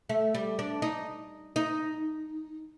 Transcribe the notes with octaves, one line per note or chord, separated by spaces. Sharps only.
A3
G3
D4
D#4
D#4